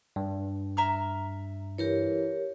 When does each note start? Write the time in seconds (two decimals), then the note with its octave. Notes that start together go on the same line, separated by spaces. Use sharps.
0.16 G2
0.77 E5 A#5 F6
1.78 E3 G4 A#4 C#5